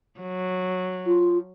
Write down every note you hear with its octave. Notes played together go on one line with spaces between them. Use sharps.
F#3
F4